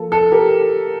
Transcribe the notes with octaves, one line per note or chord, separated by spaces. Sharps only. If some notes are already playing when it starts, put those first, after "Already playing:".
Already playing: F3 A#3 A4
A4
G4 A#4